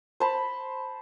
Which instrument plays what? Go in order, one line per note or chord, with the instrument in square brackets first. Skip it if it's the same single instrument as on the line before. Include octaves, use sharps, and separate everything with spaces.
[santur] C5 A5 B5